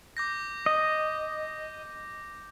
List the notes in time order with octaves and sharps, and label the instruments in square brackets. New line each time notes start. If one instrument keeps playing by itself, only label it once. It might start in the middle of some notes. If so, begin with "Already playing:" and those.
[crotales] D6 G6 A#6
[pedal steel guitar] D#5